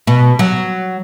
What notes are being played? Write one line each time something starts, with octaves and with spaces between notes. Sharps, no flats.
B2
F#3